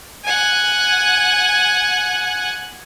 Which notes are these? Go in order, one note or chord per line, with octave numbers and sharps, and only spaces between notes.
F#5 G#5